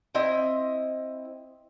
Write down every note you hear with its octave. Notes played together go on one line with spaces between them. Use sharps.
C4 E4 D#5